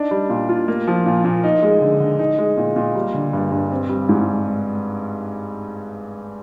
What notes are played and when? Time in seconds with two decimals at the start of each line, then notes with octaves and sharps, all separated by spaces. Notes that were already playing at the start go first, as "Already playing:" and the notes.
Already playing: D4 D#4
0.11 G3
0.30 A#2
0.49 F4
0.68 A#3
0.87 F3
1.06 A#2
1.24 A#2
1.44 D#4
1.63 G#3
1.81 D3
2.00 D3
2.19 D#4
2.38 G#3
2.57 A#2
2.76 A#2
2.95 G3
3.14 D3
3.33 G2
3.52 G2
3.71 C4
3.89 G3
4.09 G#2